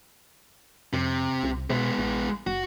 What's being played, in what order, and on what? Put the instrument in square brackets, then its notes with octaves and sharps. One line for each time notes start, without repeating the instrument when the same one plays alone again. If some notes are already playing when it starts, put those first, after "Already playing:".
[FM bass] F2 [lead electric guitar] C3
[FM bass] C2
[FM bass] B2 [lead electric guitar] G#3 B3
[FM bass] A1
[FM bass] F#1 [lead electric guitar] F#4